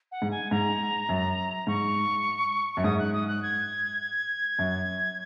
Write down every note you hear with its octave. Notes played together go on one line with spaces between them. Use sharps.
F#5
G#2
G#5
G#2 A#5
F#2
G#2 C#6
F#2 C#6
G#2 D#6
F#6
D#6
F#6
G#6
F#2